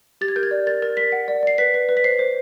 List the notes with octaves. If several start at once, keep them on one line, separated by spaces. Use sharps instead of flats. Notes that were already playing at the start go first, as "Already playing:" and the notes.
G4 A6
G#6
A#4 G6
G#6
D5
A#4 A6
A#4 A6
A#4 B6
F#5
D5
D5 C7
B4 B6
B4
B4
B6
C5 C7
C5